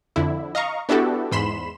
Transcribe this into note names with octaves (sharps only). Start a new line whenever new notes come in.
F2 D3 E4
D#5 F5 A#5 C#6
B3 D4 E4 F#4 G4 A4
E2 G#2 B5 C6 E7